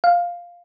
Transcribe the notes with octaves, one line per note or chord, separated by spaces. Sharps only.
F5